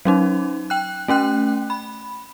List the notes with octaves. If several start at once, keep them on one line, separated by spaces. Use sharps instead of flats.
F#3 C#4 D#4
G5 F#6
A3 C#4 G5 F#6
B5